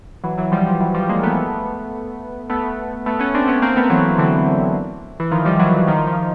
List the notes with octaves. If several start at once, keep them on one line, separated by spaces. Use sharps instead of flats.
E3 F#3
E3 F#3
F3 G3
F3 G3
E3 F#3
F3 G3
G#3 A#3
A3 B3
A3 B3
A3 B3
B3 C#4
C4 D4
B3 C#4
A#3 C4
A3 B3
E3 F#3
D3 E3
E3
D#3 F3
F3 G3
E3 F#3
E3 F#3
D#3 F3
D#3 F3